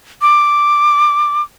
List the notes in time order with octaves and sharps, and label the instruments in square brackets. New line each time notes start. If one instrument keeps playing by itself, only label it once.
[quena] D6